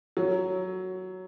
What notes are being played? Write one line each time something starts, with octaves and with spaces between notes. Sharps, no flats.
F#3